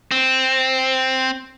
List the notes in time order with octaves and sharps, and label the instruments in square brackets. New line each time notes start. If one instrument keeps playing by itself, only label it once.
[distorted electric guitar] C4